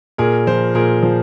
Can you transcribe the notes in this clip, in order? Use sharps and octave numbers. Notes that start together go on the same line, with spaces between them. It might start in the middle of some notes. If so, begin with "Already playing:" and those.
A#2 G#4 A#4
F3 A#4 C5
A#2 G#4 A#4
F3